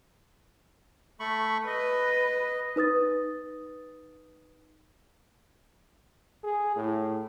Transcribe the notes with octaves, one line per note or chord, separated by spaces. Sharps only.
A3 B5 C#6
B4 D#5
D#4 B4 D#6 A6
G#4
A2